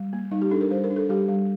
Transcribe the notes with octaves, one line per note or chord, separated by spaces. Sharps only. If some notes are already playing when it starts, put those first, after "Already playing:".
Already playing: G3
A#3
G3 D#4
G4
D4 A4
A#4
G3 C5
A#4
D4
A4
G3 G4
G3